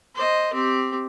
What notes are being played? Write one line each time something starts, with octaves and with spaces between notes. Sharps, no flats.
C5 D#5
C4 G4